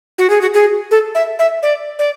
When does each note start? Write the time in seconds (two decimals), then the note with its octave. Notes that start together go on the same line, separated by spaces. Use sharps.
0.18 F#4
0.30 G#4
0.41 F#4
0.54 G#4
0.91 A4
1.15 E5
1.39 E5
1.63 D5
1.99 D5